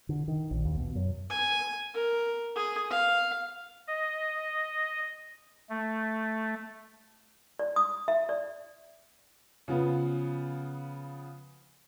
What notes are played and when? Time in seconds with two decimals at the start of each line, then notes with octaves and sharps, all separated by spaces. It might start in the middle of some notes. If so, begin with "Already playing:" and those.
0.09 D3
0.28 D#3
0.51 A#1
0.65 D#2
0.77 B2
0.95 F#2
1.30 G#5
1.94 A#4
2.55 G#4
2.90 F5
3.88 D#5
5.69 A3
7.59 D5
7.76 D#6
8.08 E5
8.29 D5
9.68 C#3 F3 B3